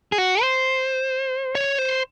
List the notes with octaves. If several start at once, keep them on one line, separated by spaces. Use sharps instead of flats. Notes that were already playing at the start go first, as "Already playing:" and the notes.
G#4
F#4
C5
C#5
C5